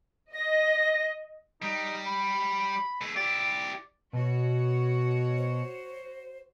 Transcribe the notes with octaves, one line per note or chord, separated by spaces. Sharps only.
D#5 A#6
G3 D#4
B5
A3 G#4
E4 G4 D5
B2 F#4 C#5
C5